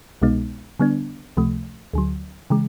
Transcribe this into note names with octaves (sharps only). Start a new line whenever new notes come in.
C2 B2 G#3 B3 D#4
D3 G3 B3 D4
C#2 C3 F3 A3
D2 D3 F#3
C#3 E3 G#3